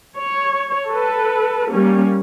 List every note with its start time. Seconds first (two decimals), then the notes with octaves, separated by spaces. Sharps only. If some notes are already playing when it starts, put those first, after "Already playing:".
0.17 C#5
0.89 A4 B4
1.71 G3 A#3 C#4